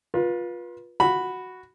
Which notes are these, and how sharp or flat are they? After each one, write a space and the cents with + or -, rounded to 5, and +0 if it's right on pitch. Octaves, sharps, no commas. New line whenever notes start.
F4 +15 B4 -30
F#4 +0 B5 +0